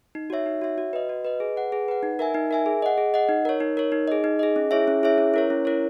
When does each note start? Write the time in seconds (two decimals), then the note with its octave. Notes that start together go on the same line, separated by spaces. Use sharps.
0.15 D#4
0.30 F#4 C#5 E5
0.46 D#4
0.61 F#4 C#5 E5
0.78 F#4
0.93 B4 D#5
1.09 F#4
1.25 B4 D#5
1.40 G#4
1.57 B4 F#5
1.72 G#4
1.88 B4 F#5
2.03 D#4
2.19 A#4 E5 G#5
2.34 D#4
2.51 A#4 E5 G#5
2.66 G#4
2.82 D#5 F#5
2.98 G#4
3.14 D#5 F#5
3.29 D#4
3.45 A#4 C#5
3.60 D#4
3.77 A#4 C#5
3.92 D#4
4.08 G#4 D#5
4.24 D#4
4.39 G#4 D#5
4.56 C#4
4.71 E4 G#4 C#5 E5
4.88 C#4
5.03 E4 G#4 C#5 E5
5.18 C#4
5.34 E4 A#4 C#5
5.50 C#4
5.65 E4 A#4 C#5